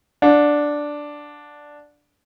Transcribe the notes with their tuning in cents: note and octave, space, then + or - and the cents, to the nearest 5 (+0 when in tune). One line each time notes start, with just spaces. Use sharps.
D4 +0 F#5 -40